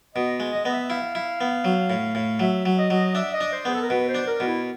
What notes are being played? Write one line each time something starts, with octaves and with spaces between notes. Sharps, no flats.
B2 D#5
G#3
D#5
B3 D#5
E5
E4 F5
E4
B3
F#3
A2
A2
F#3 E5
F#3
D#5
F#3
D4 E5
D#5
D4
C5
B3 G#4
A4
A#4
B2 B4
C5
D4
A#4
B2
E4